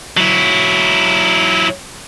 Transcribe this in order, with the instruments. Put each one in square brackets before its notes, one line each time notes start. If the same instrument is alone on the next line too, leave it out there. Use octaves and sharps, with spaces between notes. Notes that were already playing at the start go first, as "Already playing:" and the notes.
[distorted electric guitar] F#3 E4